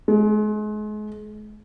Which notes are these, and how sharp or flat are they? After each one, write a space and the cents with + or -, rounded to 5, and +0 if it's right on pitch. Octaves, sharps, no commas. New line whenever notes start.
G#3 +35